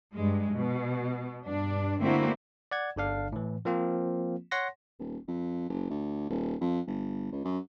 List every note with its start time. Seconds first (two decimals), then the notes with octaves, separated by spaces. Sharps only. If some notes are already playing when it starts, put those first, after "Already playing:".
0.13 G2 G#3
0.55 B2
1.46 G2 D4
2.01 D3 A3 A#3 C4 E4 F#4
2.71 D5 F#5 G#6
2.96 G1 D3 D4 F5
3.32 A2 E3
3.65 F3 A#3 C4 F4
4.51 C#5 F#5 C6 A#6
4.99 D#1
5.28 F2
5.69 F#1
5.90 D2
6.30 D#1
6.61 F2
6.87 G1
7.32 C#2
7.44 F#2